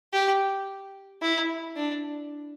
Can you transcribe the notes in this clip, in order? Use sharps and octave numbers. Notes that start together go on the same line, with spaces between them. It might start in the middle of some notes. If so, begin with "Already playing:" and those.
G4
E4
D4